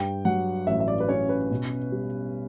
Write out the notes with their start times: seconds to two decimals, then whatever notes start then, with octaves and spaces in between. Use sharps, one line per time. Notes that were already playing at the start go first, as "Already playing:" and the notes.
Already playing: G2 G5
0.25 F#3 F#5
0.67 A1 E5
0.80 E5
0.88 D5
1.00 B4
1.08 C#4 C#5
1.29 B4
1.51 B2
1.92 G3